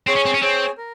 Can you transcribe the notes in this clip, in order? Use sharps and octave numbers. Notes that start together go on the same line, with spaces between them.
C4 G#4 C#5 G#5
C#4
C4
C#4
C4 G#4 C#5 G#5
A#4